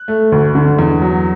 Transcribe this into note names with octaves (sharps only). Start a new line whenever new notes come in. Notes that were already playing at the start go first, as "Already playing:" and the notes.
Already playing: F#6
A3
D2
D3
E2
F#3